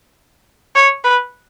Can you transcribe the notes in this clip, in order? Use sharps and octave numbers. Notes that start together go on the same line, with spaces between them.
C#5
B4